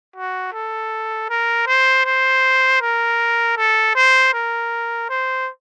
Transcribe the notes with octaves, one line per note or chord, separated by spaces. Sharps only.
F#4
A4
A#4
C5
C5
A#4
A4
C5
A#4
C5